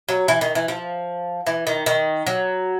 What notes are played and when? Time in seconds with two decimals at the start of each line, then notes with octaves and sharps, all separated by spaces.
0.09 F#3
0.28 E3
0.41 D#3
0.55 E3
0.68 F3
1.47 E3
1.67 D#3
1.86 D#3
2.27 F#3